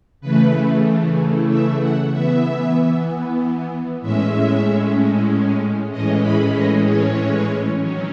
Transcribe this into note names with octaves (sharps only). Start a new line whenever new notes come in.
C#3 E3 A3 B4
E5
F#5
E3 B3 E5
A2 G#3 C#4 E5
A2 E3 G#3 C#4 D#5
B5
D#5
C#5
D#3 F#3 C#4